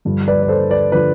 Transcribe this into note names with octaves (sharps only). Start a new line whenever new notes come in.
G2 D3 F3
B4 D5
D5
A4 C5
B4 D5
D3 F3 B4 D5